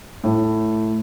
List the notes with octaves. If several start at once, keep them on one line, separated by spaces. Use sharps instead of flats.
A2